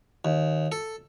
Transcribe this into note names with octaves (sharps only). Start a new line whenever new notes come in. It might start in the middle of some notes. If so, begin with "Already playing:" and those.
D#2
A4